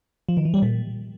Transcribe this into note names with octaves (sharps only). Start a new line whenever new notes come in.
F3
D#3
E3
G3
A#2